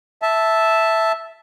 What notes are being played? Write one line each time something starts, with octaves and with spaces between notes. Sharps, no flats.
E5 A5